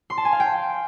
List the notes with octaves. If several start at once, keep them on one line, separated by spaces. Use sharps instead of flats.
C6
A5
G#5
F5
G5